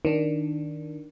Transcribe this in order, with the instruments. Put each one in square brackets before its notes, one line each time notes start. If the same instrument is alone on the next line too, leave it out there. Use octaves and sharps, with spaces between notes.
[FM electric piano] D#3 D4